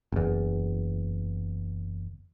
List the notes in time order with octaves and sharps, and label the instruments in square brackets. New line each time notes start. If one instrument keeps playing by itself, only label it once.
[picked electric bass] F#1 E2